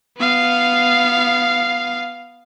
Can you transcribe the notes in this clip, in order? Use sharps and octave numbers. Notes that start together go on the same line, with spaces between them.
B3 F5